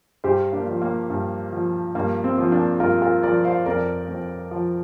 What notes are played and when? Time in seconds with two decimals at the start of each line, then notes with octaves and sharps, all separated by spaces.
0.24 G2 G4 C5
0.52 A#3 D4
0.67 F3
0.82 A#3
1.10 G2
1.52 F3
1.95 G2 A#3
2.24 C4
2.38 F3
2.52 A#3 D4
2.80 G2 F4 A#4
3.02 F4 A#4
3.23 F3 A#4 D5
3.44 C5 F5
3.66 F2 A#4 D5
4.09 F2
4.51 F3